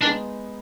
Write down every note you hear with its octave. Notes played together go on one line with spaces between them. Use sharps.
G#3 B3 D4 D#4